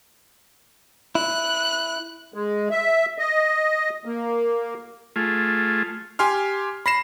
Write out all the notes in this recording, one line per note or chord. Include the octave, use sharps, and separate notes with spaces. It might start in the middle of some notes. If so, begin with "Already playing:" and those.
E4 F#6
G#3
E5
D#5
A#3
A3 F4 G#4
G4 G#5 C6 F6
B5 A#6 C7 E7